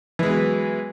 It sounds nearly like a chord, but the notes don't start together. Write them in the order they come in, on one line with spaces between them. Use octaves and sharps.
E3 G#3 B3 F#3